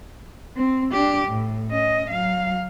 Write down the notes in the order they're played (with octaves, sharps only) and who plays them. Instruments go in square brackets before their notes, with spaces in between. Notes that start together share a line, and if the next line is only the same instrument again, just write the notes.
[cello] C4
D4 G4
A2
C#4 D#5
F#3 F5